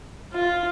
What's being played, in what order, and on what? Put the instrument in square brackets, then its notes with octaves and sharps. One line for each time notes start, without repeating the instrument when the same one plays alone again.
[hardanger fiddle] F4